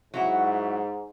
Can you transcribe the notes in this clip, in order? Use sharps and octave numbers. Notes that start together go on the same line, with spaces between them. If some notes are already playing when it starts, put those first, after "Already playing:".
G#2 F#3 E4 F#4